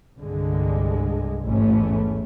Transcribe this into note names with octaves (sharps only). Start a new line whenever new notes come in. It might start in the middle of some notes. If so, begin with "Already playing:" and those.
C2 G2 D3 G#3
A1 E2 G#2 E3 A3 C#4